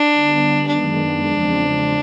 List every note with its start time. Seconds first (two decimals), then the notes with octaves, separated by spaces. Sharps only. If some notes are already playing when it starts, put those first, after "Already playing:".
Already playing: D4
0.13 D3 G3 B3
0.67 F#2 D#3 G#3 B3 D4
1.24 E2 C#3 F3 G#3 C4